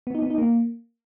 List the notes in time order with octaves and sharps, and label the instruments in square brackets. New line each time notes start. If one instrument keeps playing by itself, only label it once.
[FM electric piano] B3
D#4
B3
D#4
A#3